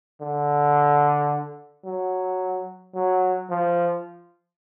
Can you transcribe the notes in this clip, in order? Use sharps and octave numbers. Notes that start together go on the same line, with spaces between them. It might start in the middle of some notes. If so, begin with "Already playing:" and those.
D3
F#3
F#3
F3